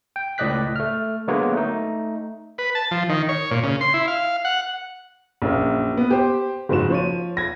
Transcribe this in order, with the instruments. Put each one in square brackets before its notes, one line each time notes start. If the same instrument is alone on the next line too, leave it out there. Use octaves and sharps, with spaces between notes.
[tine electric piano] G5
C#2 A2 D5 D#5 F#6 B6
A3 F6
D3 F#3 G#3 A#3 B3 C#5
A3 D#4
[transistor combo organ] B4
A5
F3
D#3
C#5
A#2
C#3
C6
E4
F5
F#5
[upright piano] A#1 F#2 A#3
B3
G4 C5
F#1 G#2 F3 F#4 E7
F3 C#5 D#7
G#6 A#6